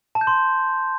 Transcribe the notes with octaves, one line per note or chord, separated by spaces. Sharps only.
A5
G6
C6